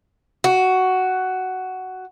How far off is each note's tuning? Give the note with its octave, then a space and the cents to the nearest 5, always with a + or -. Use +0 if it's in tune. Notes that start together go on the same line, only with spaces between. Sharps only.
F#4 +10